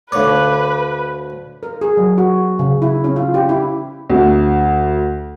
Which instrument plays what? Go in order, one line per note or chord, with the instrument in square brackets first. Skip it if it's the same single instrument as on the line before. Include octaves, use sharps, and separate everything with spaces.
[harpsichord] D2 C#5 [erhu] B4 [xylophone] F5 D6
[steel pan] A#4
G#4
F#3
F#4
C#3
E4
C#4
F4
G4
E4
[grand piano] D2